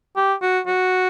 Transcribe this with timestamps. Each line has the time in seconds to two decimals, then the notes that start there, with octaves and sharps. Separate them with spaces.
0.16 G4
0.42 F#4
0.67 F#4